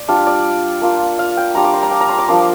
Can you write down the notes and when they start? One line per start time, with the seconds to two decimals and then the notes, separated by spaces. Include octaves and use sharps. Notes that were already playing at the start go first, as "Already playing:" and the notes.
Already playing: D5
0.08 G3 D4 F4 F5
0.27 D5
0.81 A#3 D4 F4
1.19 F5
1.37 G5
1.55 G3 D4 F4 A#5
1.64 D6
1.74 C6
1.83 A#5
1.91 G5
2.01 A#5
2.09 C6
2.18 D6
2.28 F3 A#3 D4 C6